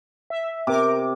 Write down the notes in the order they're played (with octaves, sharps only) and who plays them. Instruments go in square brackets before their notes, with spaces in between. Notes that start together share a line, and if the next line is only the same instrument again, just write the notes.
[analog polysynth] E5
[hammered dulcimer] C3 [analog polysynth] A#4 D6